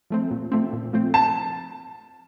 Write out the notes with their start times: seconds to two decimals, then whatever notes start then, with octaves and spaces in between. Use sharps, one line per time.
0.10 F3 A3 C4
0.31 A#2
0.52 F3 A3 C4
0.73 A#2
0.93 F3 A3 C4
1.14 A5